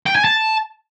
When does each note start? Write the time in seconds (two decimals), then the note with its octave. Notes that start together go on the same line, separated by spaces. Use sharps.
0.06 G5
0.15 G#5
0.25 A5